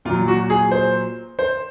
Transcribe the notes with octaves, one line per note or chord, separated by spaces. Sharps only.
A#2 F#3 F4
F#4
G#4
C5
C5